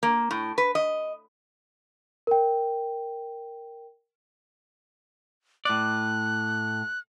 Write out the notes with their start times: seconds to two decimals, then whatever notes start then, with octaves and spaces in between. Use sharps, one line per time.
0.03 A#3
0.31 A2
0.58 B4
0.75 D#5
2.27 A#4 G5
5.65 A2 D5 F#6